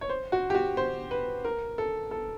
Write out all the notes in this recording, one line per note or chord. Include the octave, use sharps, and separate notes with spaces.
C#5
C5
F#4
G4
F#4
C5
B4
A#4
A4
A4